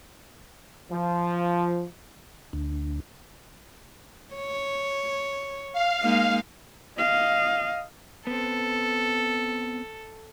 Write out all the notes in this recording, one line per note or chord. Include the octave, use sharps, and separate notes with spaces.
F3
D2
C#5
F5
G#3 A#3 D#4
D#5 F5
B3 C4 A4